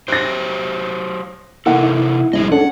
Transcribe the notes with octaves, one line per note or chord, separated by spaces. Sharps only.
F#3 G4 C5 F#6 A#6
C3 E3 A#3 D#4 E4 A4 F#5
C2 A2 F3 G#4 D#5
C#4 D4 A4 F#5